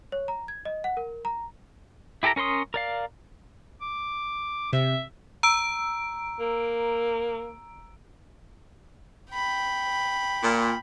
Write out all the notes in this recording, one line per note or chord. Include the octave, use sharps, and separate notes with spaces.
C#5
A#5
G#6
D#5
F#5
A#4
A#5
E4 G4 A4 A#4 A#5
C#4 A#4 C#5 C6 D#6
A#4 D5 F5
D6
C3 E5
A#5 E6 D7
A#3
G5 B5
A#2